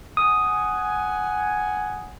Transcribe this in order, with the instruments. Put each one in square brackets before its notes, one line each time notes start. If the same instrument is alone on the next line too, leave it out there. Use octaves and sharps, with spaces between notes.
[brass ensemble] F#5 G#5 [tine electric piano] D#6